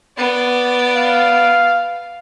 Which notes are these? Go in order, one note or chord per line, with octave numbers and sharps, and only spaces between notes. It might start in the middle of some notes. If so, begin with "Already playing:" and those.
B3 D5
F5